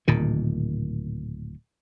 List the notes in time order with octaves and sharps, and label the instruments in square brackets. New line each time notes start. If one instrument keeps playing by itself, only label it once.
[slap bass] D1 A#2 D#3